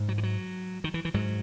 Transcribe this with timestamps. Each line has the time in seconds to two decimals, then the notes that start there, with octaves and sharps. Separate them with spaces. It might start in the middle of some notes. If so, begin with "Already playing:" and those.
Already playing: G#2
0.09 F#3
0.18 E3
0.23 F#3
0.84 D#3
0.94 E3
1.05 E3
1.14 G#2 F#3